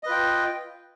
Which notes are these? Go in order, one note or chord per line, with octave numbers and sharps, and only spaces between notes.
F4 B4 D#5 G5